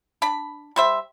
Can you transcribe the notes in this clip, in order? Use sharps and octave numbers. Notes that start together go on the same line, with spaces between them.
D4 B5
G3 C5 E5